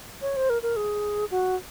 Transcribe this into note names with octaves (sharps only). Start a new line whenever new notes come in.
C#5
C5
A#4
A#4
G#4
F#4